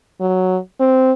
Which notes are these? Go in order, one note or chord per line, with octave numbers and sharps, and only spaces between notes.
F#3
C4